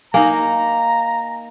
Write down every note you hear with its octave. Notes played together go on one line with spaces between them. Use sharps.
A#3 D#4 F5 G#5 A#5